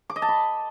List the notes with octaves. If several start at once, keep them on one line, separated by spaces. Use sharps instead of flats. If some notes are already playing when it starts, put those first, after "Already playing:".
D6
D#5
A5
B5